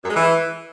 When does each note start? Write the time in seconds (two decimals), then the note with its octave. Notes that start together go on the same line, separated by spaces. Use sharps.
0.04 F#2
0.10 G#3
0.16 E3